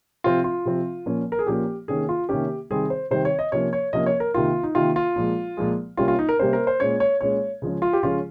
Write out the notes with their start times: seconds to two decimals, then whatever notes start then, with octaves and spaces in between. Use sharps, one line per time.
0.24 C3 F3 C4 F4
0.44 F4
0.65 C3 F3 C4
1.06 A#2 F3 A#3 C#4
1.32 A#4
1.39 G#4
1.47 A#2 F3 A#3 C#4 G4
1.88 C3 D#3 A#3 C#4 G#4
2.09 F4
2.29 C3 D#3 A#3 C#4 G4
2.70 C3 D#3 G3 C4 G#4
2.90 C5
3.11 C3 D#3 G3 C4 C5
3.25 C#5
3.39 D#5
3.52 C3 F3 A#3 C#4 C#5
3.73 C#5
3.93 C3 F3 A#3 C#4 D#5
4.06 C#5
4.20 A#4
4.34 C3 D#3 A#3 F4
4.63 D#4
4.75 C3 D#3 A#3 F4
4.96 F4
5.16 A#2 F3 G#3
5.57 A#2 F3 G#3
5.97 C3 G3 A#3 C#4 F4
6.08 F4
6.19 D#4
6.29 A#4
6.39 C3 G3 A#3 C#4 C5
6.53 A#4
6.67 C5
6.80 A#2 G#3 C#4 C#5
7.00 C#5
7.21 A#2 G#3 C#4 C#5
7.62 C#3 F3 G#3 C#4
7.82 F4
7.93 G4
8.03 C#3 F3 G#3 C#4 F4